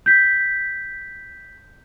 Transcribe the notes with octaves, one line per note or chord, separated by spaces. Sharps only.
G6 B6